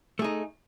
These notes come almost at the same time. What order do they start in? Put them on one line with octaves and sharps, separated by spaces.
A3 G#4 D#4